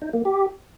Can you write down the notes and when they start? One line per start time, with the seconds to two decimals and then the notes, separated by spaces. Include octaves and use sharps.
0.02 D#4
0.13 A#3
0.25 G4